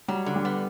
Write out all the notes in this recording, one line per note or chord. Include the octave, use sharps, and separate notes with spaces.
F#3 G3
D3
G3
B3